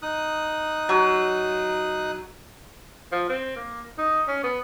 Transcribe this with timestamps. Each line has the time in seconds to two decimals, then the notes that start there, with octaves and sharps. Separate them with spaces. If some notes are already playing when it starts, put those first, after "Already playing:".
0.02 D#4 D#6 F#6
0.89 F#3
3.12 F3
3.29 C4
3.56 A#3
3.98 D#4
4.28 C#4
4.44 B3